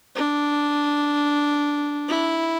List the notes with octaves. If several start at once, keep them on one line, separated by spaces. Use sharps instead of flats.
D4
E4